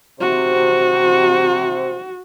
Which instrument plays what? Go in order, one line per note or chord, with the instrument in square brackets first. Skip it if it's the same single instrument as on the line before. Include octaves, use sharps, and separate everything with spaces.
[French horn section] C3 C5 [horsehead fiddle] F#4